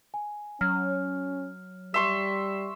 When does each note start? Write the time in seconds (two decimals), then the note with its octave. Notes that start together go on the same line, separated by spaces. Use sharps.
0.14 G#5
0.61 F#3 C#4 F6
1.94 G3 E5 C6 C#6